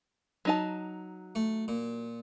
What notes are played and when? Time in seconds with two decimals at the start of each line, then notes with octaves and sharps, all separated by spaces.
0.45 F#3 D#4 A5
1.35 A3
1.68 A#2